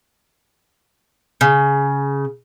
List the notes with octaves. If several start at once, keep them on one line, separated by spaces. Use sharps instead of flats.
C#3